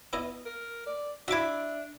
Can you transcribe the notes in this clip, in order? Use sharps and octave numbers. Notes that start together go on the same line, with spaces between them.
B3 E4 D#5
A#4
D5
D4 E4 F#4 E5 D6